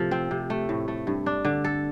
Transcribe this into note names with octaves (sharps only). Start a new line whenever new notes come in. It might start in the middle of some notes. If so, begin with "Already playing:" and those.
Already playing: A2 C3 F3 A4
C4
C3
A3
A2
A3
G2
D4
D3
A4